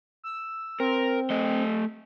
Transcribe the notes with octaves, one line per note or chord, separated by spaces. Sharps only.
E6
C4 A#4
A3 D#5